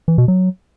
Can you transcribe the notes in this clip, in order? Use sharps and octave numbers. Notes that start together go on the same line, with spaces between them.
E3
B2
F#3